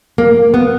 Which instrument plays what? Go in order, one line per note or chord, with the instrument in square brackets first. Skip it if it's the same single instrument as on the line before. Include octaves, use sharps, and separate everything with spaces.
[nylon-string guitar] A#3
B3